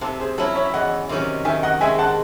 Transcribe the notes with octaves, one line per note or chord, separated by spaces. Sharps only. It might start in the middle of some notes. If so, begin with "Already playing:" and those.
C3 A4
G#4 C5
F#3 C#4 E4 A4 C#5
C#5 E5
E5
E2 D#5 F#5
C3 D#3 F#3 C#4
D#3 E5 G#5
D#5 F#5
G#3 C4 F#4 E5 G#5
F#5 A5